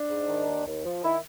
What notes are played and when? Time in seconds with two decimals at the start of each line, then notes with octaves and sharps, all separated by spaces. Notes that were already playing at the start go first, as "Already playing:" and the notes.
Already playing: D4
0.09 G#2
0.28 D#3
0.47 D#2
0.66 D#2
0.85 F3
1.03 D#3 E4